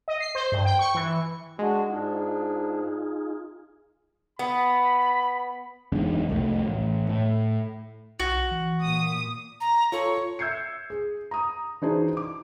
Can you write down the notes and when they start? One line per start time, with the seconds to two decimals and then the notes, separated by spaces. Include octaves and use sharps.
0.08 D#5
0.20 C7
0.35 C5
0.52 G2
0.65 G5
0.79 C#6
0.95 E3
1.59 G#3 D4 F#4
1.90 G#2 D4 D#4 F4 G#4
4.39 B3 B5
5.92 F#1 E2 G#2 D4
6.29 C2 F2 F#3 A3
6.66 A1
7.09 A2
8.20 B1 F#4
8.51 E3
8.82 A#2 D#6
9.60 A#5
9.92 F4 A4 C#5
10.39 E5 E6 G6 G#6 C7 C#7
10.90 G#4
11.31 A#5 D#6
11.82 E3 D4 D#4 F#4 G#4 C5
12.17 D6